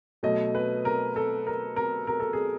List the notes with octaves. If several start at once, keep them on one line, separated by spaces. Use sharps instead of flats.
B2 F#3 A3 D#5
B4
A#4
A4
A#4
A#4
A#4
A4
G#4